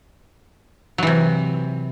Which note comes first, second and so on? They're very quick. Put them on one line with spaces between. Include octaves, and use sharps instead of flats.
F#3 E3 C3